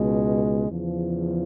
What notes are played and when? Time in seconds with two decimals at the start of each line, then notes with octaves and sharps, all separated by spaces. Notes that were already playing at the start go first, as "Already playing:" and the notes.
Already playing: C#2 B2 G#3
0.70 E2 C#3 F3